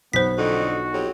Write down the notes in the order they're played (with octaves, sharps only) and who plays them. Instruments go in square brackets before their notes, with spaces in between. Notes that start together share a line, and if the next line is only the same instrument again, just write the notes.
[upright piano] B1 [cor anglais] B3 [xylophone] C5 B6
[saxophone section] F2 D3 D#4 [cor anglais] F#4
[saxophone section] F2 F#3 G4